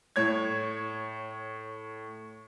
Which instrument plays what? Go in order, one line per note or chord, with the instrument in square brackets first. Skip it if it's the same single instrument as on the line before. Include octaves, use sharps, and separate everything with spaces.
[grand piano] A2 C#5 G#6